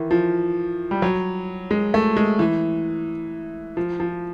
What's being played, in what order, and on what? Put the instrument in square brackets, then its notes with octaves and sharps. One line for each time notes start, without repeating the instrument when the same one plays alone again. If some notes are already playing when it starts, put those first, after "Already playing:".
Already playing: [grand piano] D#3 E3
F3
G3
F#3
G#3
A3
G#3
E3
F3
F3